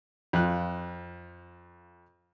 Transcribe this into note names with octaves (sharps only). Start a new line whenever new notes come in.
F2 F4 F#6